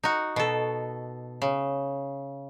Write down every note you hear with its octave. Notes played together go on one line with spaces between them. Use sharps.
D#4 F#4
B2 A4
C#3